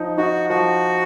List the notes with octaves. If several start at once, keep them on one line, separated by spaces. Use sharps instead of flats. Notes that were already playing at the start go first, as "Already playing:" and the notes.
Already playing: F3 D#4
D#4 F#4
F3 F#4